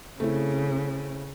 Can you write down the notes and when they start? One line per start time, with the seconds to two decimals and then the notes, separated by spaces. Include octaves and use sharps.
0.20 C#3 A3 C4 E4